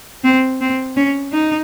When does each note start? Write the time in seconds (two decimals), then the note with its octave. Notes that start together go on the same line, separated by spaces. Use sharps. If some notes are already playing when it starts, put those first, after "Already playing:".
0.24 C4
0.61 C4
0.97 C#4
1.32 D#4